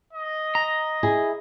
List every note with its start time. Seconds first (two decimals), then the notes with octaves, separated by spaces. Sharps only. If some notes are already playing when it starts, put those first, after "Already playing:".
0.13 D#5
0.55 A#5
1.03 E4 G#4